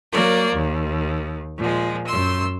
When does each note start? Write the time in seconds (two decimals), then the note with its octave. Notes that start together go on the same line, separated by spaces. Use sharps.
0.13 F#3 A#3 A#4 D5
0.55 D#2
1.59 A#2 F3 G#3
2.06 F#2 C6 E6